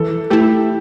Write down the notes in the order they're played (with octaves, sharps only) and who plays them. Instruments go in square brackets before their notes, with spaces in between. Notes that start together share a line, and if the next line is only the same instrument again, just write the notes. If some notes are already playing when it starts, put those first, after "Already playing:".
Already playing: [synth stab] E3 [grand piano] A4
[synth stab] A3 E4 [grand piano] G4